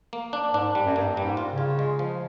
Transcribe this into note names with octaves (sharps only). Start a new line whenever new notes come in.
A#3
D4
G#2 D4
G3
F#2
G2 A#3
G3
G#2
F4
C#3
F4
G#3
F3